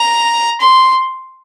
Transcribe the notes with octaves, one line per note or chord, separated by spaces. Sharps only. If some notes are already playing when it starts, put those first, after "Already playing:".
Already playing: A#5
C6